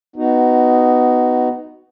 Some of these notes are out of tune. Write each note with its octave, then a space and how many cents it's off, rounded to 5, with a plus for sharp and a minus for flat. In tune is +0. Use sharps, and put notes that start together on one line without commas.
B3 +15 D#4 +0 F#4 +0